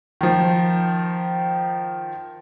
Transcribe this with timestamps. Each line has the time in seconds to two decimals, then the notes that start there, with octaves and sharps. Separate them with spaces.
0.21 D#3 F3